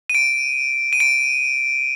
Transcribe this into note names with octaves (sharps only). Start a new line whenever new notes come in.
D#7
D7
D#7
D7